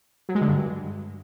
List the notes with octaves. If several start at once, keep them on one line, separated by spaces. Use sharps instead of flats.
F#3
G#3
D3
G2